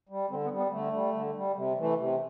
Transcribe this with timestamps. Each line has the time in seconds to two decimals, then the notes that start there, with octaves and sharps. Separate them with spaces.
0.09 G3
0.30 D3 C4
0.44 B3
0.51 G3
0.58 B3
0.72 D3 A3
0.93 G3
1.14 D3
1.35 G3
1.56 C3
1.78 E3 A3
1.99 C3